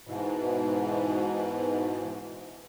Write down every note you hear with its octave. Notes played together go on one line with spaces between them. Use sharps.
G#2 B2 E3